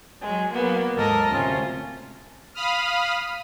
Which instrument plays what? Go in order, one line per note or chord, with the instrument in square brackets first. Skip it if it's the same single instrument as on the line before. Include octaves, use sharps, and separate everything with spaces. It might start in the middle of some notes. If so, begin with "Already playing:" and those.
[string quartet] F#3 G#3
F#3 A#3 B3
D#2 G#2 A4 A#4 D#5
D2 C3 C#4 F4
[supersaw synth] F5 B5 D#6 F6